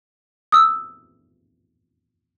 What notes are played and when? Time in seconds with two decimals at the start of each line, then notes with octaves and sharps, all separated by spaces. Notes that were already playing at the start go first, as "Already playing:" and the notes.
0.52 D#6 E6